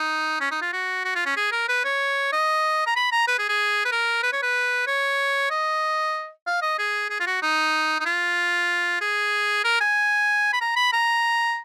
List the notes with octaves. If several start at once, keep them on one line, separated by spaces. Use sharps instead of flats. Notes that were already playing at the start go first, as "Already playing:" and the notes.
Already playing: D#4
C#4
D#4
F4
F#4
F#4
F4
C#4
G#4
A#4
B4
C#5
D#5
A#5
B5
A#5
B4
G#4
G#4
B4
A#4
B4
C#5
B4
C#5
D#5
F5
D#5
G#4
G#4
F4
F#4
D#4
D#4
F4
G#4
A#4
G#5
B5
A#5
B5
A#5